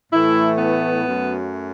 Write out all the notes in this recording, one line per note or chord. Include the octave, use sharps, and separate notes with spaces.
A2 E3 A3 E4
B3
F#2 F#3 A3